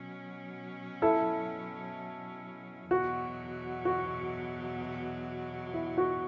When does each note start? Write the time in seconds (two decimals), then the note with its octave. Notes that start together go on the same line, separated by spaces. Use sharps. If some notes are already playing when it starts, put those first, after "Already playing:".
Already playing: B2 F#3 C#4
1.02 E4 A4
2.91 E2 B2 F#3 F#4
3.85 F#4
5.73 E4
5.98 F#4